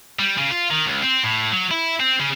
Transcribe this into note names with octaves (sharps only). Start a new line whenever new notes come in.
G3
C#3
F4
D#3
C#2
C4
A2
F#3
E4
C4
C#3